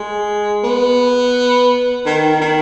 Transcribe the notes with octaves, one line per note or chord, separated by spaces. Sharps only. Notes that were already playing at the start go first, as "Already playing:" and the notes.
Already playing: G#3
B3
D#3
D#3